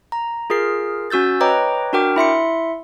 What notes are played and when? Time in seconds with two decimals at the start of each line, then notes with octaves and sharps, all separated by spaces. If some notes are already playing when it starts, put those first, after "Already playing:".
0.12 A#5
0.50 F4 G#4 A#4 C7
1.10 C#4 F#4 E6 G6 A6
1.40 B4 C#5 D#5 G5 A#5 D6
1.93 D4 F#4 A#4 G5 D6
2.16 E4 E5 C6 C#7